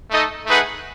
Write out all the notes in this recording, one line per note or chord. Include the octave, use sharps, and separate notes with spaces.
A3 D#4 A4 D#5
A3 D#4 G#4 B4 F#5